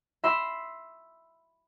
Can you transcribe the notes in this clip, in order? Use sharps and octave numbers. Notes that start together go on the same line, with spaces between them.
E5 B5 C6 E6 A#6